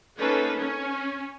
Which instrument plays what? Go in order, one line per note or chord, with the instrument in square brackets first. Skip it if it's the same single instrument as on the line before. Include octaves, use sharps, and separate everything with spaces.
[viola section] A#3 C#4 D#4 A4 B4
C#4